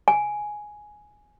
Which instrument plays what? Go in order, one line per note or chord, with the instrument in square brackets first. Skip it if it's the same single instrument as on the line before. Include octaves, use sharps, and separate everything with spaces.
[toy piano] G#5